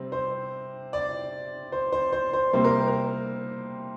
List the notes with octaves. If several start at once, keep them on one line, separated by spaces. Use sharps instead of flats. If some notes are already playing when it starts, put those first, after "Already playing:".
Already playing: C3 G3 C4
C5
D5
C5
C5
C5
C5
C3 G3 A#3 C5
A#4
A#4